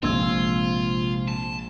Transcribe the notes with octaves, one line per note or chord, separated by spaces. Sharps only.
A#1 C3 G#3 C4 F4 E6 G#6
A5